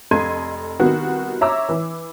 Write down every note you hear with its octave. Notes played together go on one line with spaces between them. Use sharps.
F1 A4 D#5 C6 G#6 D#7
C2 D#3 B3 F#4
C#5 E5 A#5 D6 E6
E3